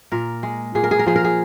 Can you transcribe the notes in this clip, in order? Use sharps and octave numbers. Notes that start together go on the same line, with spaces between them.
A#2 A#4
G#3
A#2 G#4
A#4
G#4
A#4
F3 G#4
A#4
G#4